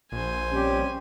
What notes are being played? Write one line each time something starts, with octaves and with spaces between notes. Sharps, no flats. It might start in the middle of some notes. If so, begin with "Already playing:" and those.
A#1 C5 G#5
G3 C4 C#4 G4